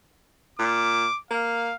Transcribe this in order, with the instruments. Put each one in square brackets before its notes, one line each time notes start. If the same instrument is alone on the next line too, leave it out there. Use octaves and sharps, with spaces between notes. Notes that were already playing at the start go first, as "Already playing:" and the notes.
[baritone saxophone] A#2 [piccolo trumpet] D6
[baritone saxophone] A#3 [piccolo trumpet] F5